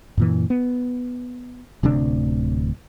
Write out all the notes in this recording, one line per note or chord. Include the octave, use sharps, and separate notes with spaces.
F#2 A#2 E3
B3
D1 D2 C3 D4